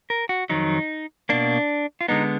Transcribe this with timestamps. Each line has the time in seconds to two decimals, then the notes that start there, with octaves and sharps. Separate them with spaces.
0.10 A#4
0.29 F#4
0.49 F2 D#3 F#3 D#4
1.29 B2 A#3 D4
2.01 F4
2.08 D3 G#3 B3 D#4